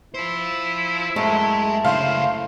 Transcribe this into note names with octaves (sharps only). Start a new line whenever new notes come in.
E4 F4 C5
F#2 G#3 A3
C#3 E4 C5 F5